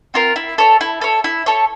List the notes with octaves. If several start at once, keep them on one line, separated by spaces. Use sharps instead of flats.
C4 F4 A#4
E4
A4 C#5
E4
A4 C#5
E4
A4 C#5